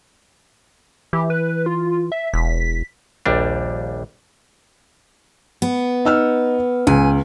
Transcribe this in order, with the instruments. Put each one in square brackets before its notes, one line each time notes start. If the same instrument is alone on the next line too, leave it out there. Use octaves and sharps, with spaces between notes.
[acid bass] E3 [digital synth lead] G4
[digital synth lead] B4
F4
E5
[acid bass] E1 [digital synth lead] B6
[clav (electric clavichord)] A#1 D#2 G3 D4
[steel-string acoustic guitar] B3
[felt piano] D#4 E6 F6
[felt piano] C#2 [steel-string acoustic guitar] G#5